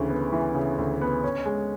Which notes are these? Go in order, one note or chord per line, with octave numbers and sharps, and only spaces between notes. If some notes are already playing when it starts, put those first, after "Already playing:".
Already playing: D2 C#3 E3
B3
E3
C#3
D2
B3
C#4
G#3